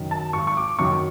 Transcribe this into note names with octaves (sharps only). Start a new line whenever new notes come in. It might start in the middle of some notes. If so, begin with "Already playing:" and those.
Already playing: F#2 D#3
A5
G#1 C#6
C#6
D6
F#2 D#3 C#6